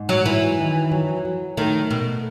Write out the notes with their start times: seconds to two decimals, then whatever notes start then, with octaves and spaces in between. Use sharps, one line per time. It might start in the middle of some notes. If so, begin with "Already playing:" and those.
Already playing: G#2
0.09 F#3
0.26 E3 F#3
0.59 D#3
0.92 F#3
1.25 F#3
1.57 D#3 A3
1.90 B2 A3